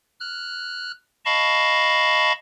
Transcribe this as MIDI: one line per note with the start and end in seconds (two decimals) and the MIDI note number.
0.20 0.91 89
0.20 0.91 90
1.25 2.32 75
1.25 2.32 77
1.25 2.32 81
1.25 2.32 83
1.25 2.32 85